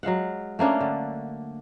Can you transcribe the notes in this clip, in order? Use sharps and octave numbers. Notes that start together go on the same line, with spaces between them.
F#3 G#3 F5 F#5
A3 A#3 C#4 D4
D3